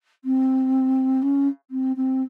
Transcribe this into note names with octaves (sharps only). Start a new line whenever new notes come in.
C4
C#4
C4
C4